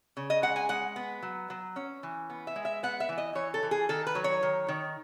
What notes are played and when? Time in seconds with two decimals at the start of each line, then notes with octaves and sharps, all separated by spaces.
0.17 C#3
0.30 D#5
0.42 G#3 F#5
0.56 G#5
0.69 G#3 F#5
0.96 B3
1.22 F#3
1.50 F#3
1.76 C#4
2.03 E3
2.30 B3
2.47 E5
2.56 G#3
2.65 E5
2.83 B3 F#5
3.00 E5
3.09 E3
3.18 D#5
3.35 E3 C#5
3.54 A4
3.63 E3
3.71 G#4
3.89 D#3 A4
4.07 B4
4.15 F#3
4.24 C#5
4.43 D#3
4.68 D#3